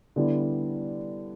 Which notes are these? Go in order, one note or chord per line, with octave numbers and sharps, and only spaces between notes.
D3 G3 B3 E4